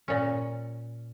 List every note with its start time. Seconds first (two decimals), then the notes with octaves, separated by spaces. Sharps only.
0.08 A#2 C#4